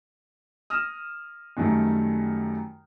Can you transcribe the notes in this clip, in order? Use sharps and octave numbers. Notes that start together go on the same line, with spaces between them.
D#6 F6 A#6 E7
F#2 D#3 G3 A3